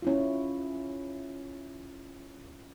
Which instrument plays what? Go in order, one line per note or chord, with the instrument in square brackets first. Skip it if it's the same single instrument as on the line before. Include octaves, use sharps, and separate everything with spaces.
[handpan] C#4 E4 F4